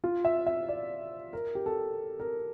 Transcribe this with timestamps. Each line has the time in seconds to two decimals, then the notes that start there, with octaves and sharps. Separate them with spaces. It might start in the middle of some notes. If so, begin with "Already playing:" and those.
0.04 F4
0.25 E5
0.46 E5
0.68 D5
1.33 A#4
1.55 G4
1.66 A4
2.20 A#4